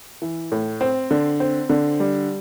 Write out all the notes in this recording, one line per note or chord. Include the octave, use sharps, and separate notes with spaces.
E3
A2
C4
D3
C4
D3
G3